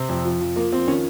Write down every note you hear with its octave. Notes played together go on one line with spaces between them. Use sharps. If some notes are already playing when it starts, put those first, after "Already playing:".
Already playing: C3 C4
F2
F3
F3
F3 A#3
F3 C4
D#3 C#4